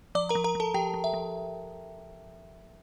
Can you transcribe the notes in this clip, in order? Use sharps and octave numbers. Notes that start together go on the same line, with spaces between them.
F3 D5 D6
A#4 A#5
F3
A#4 A#5
F3 A4 A5
F3 G4 G5
F3
E5
F3